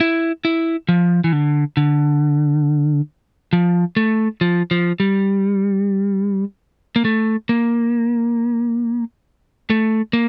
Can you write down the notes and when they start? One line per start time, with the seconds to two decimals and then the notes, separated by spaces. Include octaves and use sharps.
0.01 E4
0.45 E4
0.89 F3
1.24 E3
1.33 D3
1.77 D3
3.53 F3
3.97 A3
4.41 F3
4.71 F3
5.00 G3
6.96 A#3
7.05 A3
7.49 A#3
9.70 A3
10.13 A#3